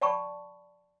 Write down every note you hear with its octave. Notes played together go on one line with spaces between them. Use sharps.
D5 G5 A5 B5 C#6